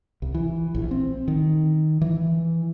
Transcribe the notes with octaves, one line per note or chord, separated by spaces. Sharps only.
C2
E3
A#1
C4
D#3
E3